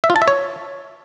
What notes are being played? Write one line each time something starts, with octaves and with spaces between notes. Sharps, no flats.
E5
F4
A5
E5
C#5